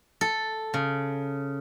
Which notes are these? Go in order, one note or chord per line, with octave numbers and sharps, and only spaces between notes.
A4
C#3